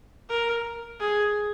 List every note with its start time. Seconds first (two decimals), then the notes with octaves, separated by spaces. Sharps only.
0.29 A#4
1.00 G#4